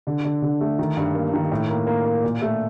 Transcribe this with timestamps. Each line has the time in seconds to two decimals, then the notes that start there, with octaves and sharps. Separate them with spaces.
0.07 D3
0.25 D3
0.42 D3
0.61 A3
0.79 D#3
0.97 G2
1.15 A#3
1.33 D#3
1.51 A2
1.70 A#3
1.87 A#3
2.05 A#3
2.23 A#2
2.42 A3